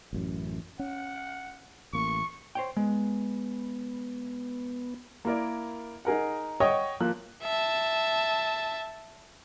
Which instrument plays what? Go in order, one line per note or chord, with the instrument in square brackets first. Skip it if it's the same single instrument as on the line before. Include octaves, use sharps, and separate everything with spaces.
[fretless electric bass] A1 F#2
[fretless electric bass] C#4 [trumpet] F#5
[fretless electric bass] A1 A#3 [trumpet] C#6
[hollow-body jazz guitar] C5 C#5 G5
[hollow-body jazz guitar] G#3 [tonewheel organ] B3
[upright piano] A#3 E4 A#4 D5
D#4 G#4 A#4 F#5
C#5 D#5 F#5 G5 C#6 D#6
F3 A#3 F#6
[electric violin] E5 A5